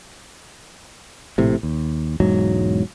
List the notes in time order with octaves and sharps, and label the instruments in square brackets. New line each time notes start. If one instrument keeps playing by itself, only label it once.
[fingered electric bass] A#1 A2 C3
D#2
E1 G#2 F#3